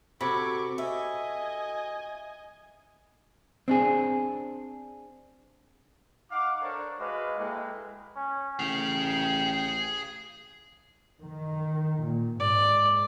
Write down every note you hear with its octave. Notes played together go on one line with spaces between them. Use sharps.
C3 F#4 A4 B5 C#6 D6 G#6 D7
D#5 E5 G#5
C4 D4 G#4
D#4 F5 F#5 D6
D4 A4 A#4 C5 C#5
G#3 F#4 B4 D#5 F5 D6
G#3 A#3 E4 A4 B4 G5
C#4
A1 G#4 F5 G5
D#3
A#2
G#2 D5